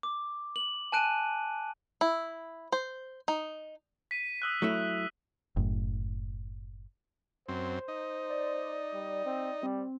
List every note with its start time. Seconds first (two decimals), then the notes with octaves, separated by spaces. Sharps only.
0.03 D6
0.56 F#7
0.92 G#5 A5 F#6 D7 D#7
2.01 E4
2.72 C5
3.28 D#4
4.11 B6 D#7
4.42 D#6 E6 F#6
4.62 F#3 A3 E4
5.57 F#1 A2
7.48 F#2 C4 C5
7.88 D#4
8.30 D5
8.94 G3
9.26 C4
9.63 G3 C4